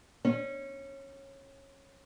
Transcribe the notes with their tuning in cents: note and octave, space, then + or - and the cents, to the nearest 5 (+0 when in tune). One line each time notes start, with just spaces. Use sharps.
C#4 -20